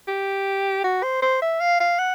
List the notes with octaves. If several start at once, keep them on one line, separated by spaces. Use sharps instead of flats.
G4
F#4
C5
C5
E5
F5
F5
F#5